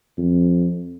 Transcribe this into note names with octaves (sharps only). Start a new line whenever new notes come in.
F2